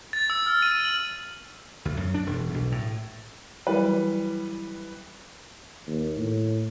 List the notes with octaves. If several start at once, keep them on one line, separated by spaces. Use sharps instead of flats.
A6
E6
F6
D#7
F#7
D2
F#2
D4
E1
B1
A2
E3 F#3 G3 B4
D#2
A2